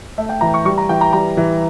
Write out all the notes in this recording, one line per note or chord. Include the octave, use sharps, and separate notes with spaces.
A3 E5
G5
E3 A#5
C#6
G3 C#6
A#5
E3 G5
A#5
G3 A#5
E3